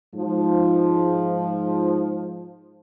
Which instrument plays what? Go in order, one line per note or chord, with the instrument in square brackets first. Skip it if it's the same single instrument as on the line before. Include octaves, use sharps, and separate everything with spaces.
[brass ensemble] G#2 F3